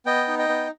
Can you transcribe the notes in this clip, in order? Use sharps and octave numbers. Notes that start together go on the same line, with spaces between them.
B3 D#5 G5
D#4
D#5 G5
B3